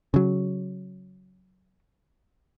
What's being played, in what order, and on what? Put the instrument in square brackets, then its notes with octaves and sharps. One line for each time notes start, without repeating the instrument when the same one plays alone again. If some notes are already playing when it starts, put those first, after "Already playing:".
[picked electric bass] C#3 F#3